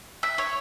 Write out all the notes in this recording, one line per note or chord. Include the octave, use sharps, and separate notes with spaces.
E5
C#5